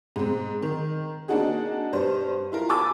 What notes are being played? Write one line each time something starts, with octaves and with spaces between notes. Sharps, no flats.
G#2 C4
D#3
A#3 C4 D4 D#4 F#4 G#4
G2 B4 C5
E4 F4 A#4
G#5 A5 B5 D6 E6 A6